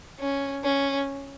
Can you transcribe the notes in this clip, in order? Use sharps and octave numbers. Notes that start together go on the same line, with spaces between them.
C#4
C#4